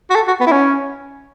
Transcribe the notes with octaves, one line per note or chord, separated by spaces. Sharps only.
F#4
A4
F#4
B3
E4
C#4